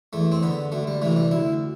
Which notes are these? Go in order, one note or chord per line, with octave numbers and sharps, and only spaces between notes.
E2 A3
C4
D3 B3
D2 A3
G3
C3 E3 A3
G3
D2 E4